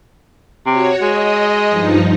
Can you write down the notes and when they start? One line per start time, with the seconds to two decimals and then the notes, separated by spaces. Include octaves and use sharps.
0.67 C3 F#4 C#5
1.02 G#3 D#5
1.70 G2 F3 D#4